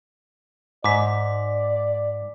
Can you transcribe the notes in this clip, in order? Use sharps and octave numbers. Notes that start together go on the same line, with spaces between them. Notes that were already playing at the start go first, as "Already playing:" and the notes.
G#2 D5 D6 B6